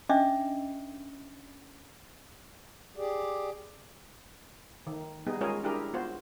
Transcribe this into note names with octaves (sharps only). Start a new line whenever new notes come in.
C#4 D4 D#5 E5 D6
G4 G#4 D5
D#3
G3 B3 D#4 G#4
G#3 C#4 F4 G#4 A#4 C#5
D4 E4 G4 G#4 A#4
B3 F4 F#4 C5